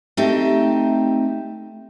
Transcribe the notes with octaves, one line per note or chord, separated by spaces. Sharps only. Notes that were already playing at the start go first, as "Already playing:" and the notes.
A3 C4 D#4 G4 E5 A5